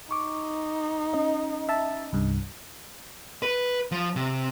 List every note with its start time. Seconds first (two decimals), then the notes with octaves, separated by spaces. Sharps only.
0.11 D#4 C#6 D6
1.14 C#4 D#5
1.69 E5 A5
2.13 C2 G2
3.43 B4
3.92 F3
4.16 C3